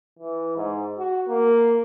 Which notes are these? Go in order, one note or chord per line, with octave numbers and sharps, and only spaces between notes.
E3
G#2
F#4
A#3